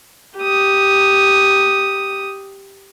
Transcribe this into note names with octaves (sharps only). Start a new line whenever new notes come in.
G4 D#6